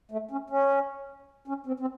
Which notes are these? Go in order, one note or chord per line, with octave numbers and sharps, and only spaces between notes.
A3
C#4
C#4
C#4
C4
C4